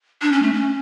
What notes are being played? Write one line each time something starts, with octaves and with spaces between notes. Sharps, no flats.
D4
C#4
A3
C#4